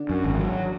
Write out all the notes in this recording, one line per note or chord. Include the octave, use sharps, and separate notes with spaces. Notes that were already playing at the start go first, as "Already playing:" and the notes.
Already playing: D3 D4
F#2
G#1
F#3